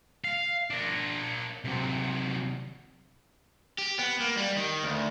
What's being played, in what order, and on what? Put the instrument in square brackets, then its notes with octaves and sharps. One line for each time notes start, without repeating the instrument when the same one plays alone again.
[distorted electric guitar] F5
D4 A#4
C3 F#3
[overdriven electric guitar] G4
B3
A#3
G3
D#3
D2